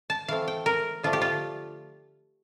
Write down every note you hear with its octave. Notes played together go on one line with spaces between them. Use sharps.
A5
E3 A3 C4 F5
G5
A#4
D3 F3 A3 D4 F4
G4
F4